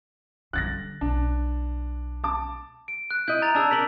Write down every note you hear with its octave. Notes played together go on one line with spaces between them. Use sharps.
D3 G3 F#6 A6 A#6
B1 D4
A5 D6
D7
F#6
E4 D#5 G6
A#5 A6 F7
D4 G#4 A5 E6
D4 A#4 B6 F#7